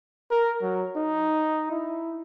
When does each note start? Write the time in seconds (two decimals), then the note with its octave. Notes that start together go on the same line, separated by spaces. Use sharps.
0.31 A#4
0.62 F#3
0.96 D#4
1.71 E4